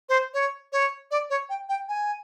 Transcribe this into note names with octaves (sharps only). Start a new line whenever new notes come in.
C5
C#5
C#5
D5
C#5
G5
G5
G#5